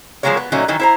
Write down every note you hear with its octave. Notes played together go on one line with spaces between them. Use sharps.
F3 F#3 G#3 A#3 A#4 C#5
B3
A#2 F#3 A3 C#4 D#4
D#3 E3 F#3 D#4
E4 C5 A#5